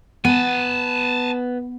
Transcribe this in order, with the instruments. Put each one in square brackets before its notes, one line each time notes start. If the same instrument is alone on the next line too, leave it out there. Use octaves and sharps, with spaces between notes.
[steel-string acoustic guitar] B3 [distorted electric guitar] G#5 A5